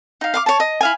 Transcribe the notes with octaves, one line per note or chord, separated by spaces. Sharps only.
D#4 F5
F5 C#6 D6
C#5 A5
D#5
E4 F5 G#5